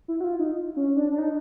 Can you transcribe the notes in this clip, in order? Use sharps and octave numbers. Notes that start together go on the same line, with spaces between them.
E4
F#4
F4
D#4
C#4
D4
D4
D#4